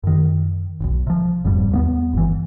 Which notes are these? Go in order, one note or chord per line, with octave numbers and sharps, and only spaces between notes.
F#2 D#3
E1 B1
C3 F3
F1 F2 G#2 G3
D#2 A#3 B3
G1 E3